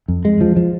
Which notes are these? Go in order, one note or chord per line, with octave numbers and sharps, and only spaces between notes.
F2
G#3
F3
F3